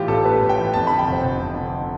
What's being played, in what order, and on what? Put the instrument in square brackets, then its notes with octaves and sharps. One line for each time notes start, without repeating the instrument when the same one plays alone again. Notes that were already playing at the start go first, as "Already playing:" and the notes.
Already playing: [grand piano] A2 E3 F4 G4
A1 A4
A3 B4
A2
G5
E3
F2 A5
D3 B5
G5
F1 C5
F1
F2
D3